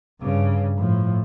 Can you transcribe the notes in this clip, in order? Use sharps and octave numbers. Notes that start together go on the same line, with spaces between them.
G2 C#3
A2 F3